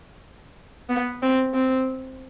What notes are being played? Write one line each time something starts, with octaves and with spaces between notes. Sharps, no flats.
B3
C4
C4